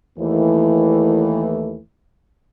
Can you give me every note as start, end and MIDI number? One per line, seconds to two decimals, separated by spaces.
0.18 1.78 39
0.18 1.78 52
0.18 1.78 57